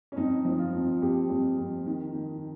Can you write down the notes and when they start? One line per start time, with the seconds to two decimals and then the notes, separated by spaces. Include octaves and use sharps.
0.12 C#4
0.16 F2 D#4
0.45 F3
0.58 F4
0.73 F2
1.02 F2 G4
1.30 F2
1.58 F2
1.86 D#3
2.15 D#3